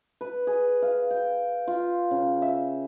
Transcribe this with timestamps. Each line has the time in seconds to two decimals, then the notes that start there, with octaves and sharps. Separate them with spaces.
0.21 B4
0.47 G#4
0.82 F5
1.11 G5
1.68 F4
2.11 C#3
2.42 E5